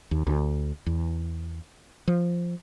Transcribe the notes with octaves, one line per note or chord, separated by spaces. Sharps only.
D#2
D2
E2
F3